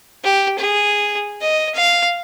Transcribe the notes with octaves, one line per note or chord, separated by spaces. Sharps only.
G4
G#4
D#5
F5